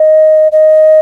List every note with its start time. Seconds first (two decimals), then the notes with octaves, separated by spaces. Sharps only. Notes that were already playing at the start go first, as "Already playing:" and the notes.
Already playing: D#5
0.52 D#5